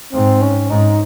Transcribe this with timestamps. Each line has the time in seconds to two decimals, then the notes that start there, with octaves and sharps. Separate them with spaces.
0.13 G#2 C4
0.42 C#4
0.70 G#2 D#4